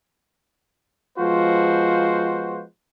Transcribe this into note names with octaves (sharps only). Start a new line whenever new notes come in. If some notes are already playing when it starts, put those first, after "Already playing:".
F3 G#3 B3 F4 F#4 C5